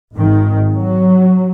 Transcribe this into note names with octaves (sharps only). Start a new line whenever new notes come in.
G#1 G#2 D#3
F#3